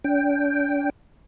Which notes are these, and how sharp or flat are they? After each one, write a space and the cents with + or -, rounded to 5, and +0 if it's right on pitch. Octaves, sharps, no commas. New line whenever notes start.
D4 -40 G5 +0